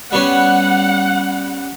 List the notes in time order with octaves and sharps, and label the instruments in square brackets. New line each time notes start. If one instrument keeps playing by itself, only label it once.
[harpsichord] G3 B3 C#4 [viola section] F#5